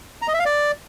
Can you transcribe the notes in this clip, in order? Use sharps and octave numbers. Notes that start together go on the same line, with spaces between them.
A#5
D#5
E5
F5
D5